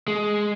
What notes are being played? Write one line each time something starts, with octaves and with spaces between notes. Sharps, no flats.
G#3